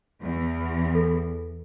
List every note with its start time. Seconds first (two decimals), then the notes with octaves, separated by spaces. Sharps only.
0.21 E2
0.95 A4